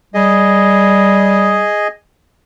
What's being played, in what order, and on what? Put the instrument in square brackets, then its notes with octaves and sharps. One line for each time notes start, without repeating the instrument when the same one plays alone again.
[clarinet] G3 [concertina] G#4 D#5